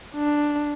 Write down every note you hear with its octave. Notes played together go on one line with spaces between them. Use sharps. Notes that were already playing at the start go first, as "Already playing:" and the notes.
D4